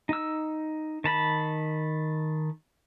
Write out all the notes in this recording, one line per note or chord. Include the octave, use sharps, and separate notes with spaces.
D#4 E6
D#3 A5 B5